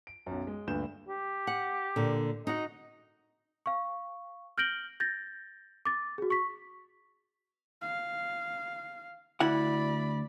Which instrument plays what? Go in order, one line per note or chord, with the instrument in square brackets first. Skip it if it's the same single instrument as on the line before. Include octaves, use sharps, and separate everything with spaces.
[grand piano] D7
B1 F#2
G#3
D2 G2 A#2 B4 G6 E7
[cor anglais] G4
[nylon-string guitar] F#5
A#2 D3
[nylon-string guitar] D#4 F#4 F#5 [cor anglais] D#5
[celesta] F5 C#6
F6 G6 A#6 D7 F#7 G7
G6 A6 A#6
D6 A6
F#4 G#4
C#6 B6
[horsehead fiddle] F5
[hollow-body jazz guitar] D2 E4 F#5 [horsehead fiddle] D5 B5